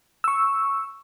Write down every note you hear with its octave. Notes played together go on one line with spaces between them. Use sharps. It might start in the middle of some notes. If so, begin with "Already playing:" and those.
C#6 E6